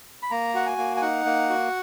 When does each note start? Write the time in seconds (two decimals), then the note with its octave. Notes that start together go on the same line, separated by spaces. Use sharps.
0.23 B5
0.31 A#3 A#5
0.54 F#4 F#5
0.66 G#5
0.78 A#3
0.97 G#5
1.02 D#4 F#5
1.26 A#3
1.50 F#4